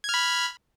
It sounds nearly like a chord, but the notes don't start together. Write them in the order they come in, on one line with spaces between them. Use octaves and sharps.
G#6 F6 B5